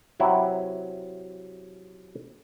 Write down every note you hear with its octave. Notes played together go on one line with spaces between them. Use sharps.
C3 F#3 E4